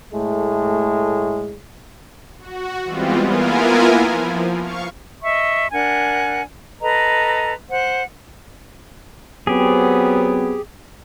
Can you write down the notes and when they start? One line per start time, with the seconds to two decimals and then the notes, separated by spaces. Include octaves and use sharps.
0.13 A2 G#3 A3
2.39 F#4
2.84 E3 G3 G#3 B3 C4 F4
3.26 A#3 B3 E4 F4 A#4 G#5
4.07 F3
4.60 F5 C#6
5.23 D#5 E5 C#6
5.72 D4 A#4 F#5 G#5
6.81 A4 B4 D#5 A#5
7.70 C5 F#5
9.47 F#3 B3 C4 G4 G#4